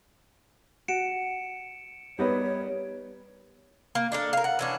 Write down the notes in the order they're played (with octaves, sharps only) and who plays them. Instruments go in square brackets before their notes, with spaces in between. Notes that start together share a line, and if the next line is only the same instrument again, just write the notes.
[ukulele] F#4 [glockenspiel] C#7 D7 E7
[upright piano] G3 B3 [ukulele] D#4 A#4 B4 [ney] C#5
[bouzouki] A#3
D4 A4 A#4
A#4 F5
F#5
E3 C#4 D4